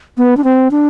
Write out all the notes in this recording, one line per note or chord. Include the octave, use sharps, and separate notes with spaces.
B3
D4
C4
D4